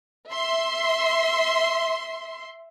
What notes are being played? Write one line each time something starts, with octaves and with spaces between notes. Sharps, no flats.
E5 C6